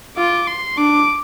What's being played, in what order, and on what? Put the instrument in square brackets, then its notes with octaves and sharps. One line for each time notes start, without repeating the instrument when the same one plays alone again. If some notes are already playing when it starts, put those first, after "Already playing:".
[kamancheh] F4 [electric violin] D6
[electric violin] C6
[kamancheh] D4 [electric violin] D6